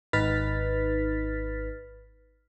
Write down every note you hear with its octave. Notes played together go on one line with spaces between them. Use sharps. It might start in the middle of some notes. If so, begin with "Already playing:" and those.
G#1 D#4 B4 F6 A6 B6